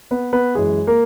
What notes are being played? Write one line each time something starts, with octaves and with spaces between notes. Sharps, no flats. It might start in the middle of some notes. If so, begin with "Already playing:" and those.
B3 B4
B3 B4
F#2 E3 G#3 G#4
A#3 A#4